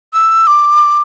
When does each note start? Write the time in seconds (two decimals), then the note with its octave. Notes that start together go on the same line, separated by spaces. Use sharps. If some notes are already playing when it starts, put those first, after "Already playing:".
0.13 E6
0.47 D6